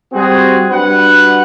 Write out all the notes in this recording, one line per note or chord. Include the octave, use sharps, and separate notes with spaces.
G3 C4 F#4 G#4
G3 D4 F#4 B4 F#5